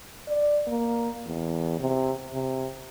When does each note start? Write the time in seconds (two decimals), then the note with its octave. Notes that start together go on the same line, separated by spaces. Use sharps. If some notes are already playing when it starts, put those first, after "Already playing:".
0.28 D5
0.67 A#3
1.26 E2
1.80 C3
2.33 C3